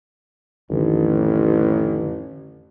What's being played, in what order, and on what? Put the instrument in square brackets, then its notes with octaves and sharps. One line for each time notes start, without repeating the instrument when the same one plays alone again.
[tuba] A1 [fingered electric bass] F2 D3 D#3